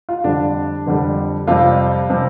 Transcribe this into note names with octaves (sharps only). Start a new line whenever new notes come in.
F4
F2 D3 G3 D4
F2 D3 G3
F2 C3 G3 F4
C3 G3